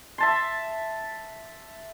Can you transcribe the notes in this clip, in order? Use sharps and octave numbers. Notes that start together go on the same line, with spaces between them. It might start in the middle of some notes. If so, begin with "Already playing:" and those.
E5 A5 C6